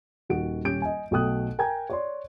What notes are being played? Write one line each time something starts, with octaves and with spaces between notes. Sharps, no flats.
D#1 D#3 F#4 F#5 D7
D#1 C#4 G4 G6 D7
D#5 G#5
B1 B2 A3 G5 D#6 F#6
A#4 G5 G#5 A#5 G#6
C#5 D5 C6